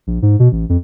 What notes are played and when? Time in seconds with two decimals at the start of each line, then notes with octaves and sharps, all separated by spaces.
0.07 A#1
0.22 G#2
0.39 B2
0.52 A1
0.69 F2